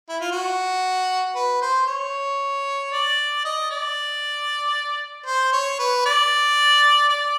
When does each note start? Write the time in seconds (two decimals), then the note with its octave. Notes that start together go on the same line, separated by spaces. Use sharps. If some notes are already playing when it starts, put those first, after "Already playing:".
0.09 E4
0.21 F4
0.32 F#4
1.35 B4
1.62 C5
1.87 C#5
2.92 D5
3.45 D#5
3.71 D5
5.26 C5
5.53 C#5
5.79 B4
6.06 D5
7.10 D5